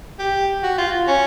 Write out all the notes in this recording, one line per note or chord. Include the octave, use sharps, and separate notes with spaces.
G4
F#4
F4
C#4